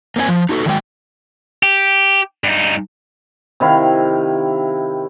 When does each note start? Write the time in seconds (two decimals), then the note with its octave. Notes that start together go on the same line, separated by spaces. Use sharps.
0.16 A#3 C4 D4 G#5
0.29 F3
0.49 D#4 F#4 G#4 A4
0.66 D#3 F#3 G#3 G5
1.63 G4
2.44 G2 D#4
3.60 C3 D#3 E4 F5